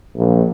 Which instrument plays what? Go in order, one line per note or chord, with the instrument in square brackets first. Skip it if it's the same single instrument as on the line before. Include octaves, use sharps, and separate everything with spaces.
[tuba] A#1